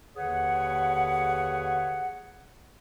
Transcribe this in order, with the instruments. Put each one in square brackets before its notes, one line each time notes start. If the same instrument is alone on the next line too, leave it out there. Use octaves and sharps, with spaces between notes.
[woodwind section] D#2 D3 G#4 B4 C#5 F#5